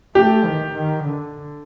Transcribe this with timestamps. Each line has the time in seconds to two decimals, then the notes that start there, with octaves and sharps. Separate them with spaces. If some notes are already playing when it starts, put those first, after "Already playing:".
0.15 A3 G4
0.45 D#3
0.74 D#3
1.03 D3